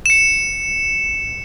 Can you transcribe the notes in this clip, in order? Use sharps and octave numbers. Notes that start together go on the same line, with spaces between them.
C#7 E7